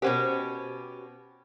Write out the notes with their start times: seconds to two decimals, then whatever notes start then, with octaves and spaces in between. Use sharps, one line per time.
0.02 B2 C#4 G4 A#4 C5 F#5